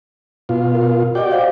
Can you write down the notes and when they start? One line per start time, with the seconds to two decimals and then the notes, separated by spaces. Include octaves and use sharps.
0.49 B2 F4
0.75 A#4
1.15 F#4 G4 D5 D#5 F#5 G5
1.31 C5 F5